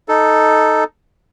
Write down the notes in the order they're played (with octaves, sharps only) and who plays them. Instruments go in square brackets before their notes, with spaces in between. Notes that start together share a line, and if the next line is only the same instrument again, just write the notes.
[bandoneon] D#4 A4